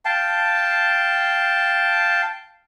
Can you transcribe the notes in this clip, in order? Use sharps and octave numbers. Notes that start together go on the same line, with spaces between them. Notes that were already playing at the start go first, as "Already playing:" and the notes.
F5 G5 A5